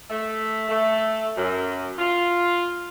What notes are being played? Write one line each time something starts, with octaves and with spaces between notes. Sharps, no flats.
A3
A3
F#2
F4